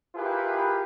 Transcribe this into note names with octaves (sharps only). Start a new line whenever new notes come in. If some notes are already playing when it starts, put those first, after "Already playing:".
E4 F4 G4 G#4 A#4 B4